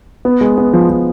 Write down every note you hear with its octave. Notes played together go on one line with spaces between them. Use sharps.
B3
G#3
B3
F3
F3